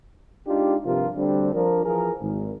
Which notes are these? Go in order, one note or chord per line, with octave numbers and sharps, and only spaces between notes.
G#3 D4 D#4 F4 G4
G2 C3 F3 D4 F4 A#4
D2 D3 G3 C4 D4
F3 D4 A#4
E3 F3 G#4 A#4
G#1